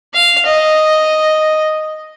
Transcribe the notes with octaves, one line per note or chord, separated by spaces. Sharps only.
F5
D#5